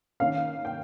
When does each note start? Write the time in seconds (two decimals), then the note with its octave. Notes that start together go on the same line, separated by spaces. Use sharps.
0.20 D#3 A#3 C#4 F5
0.65 G5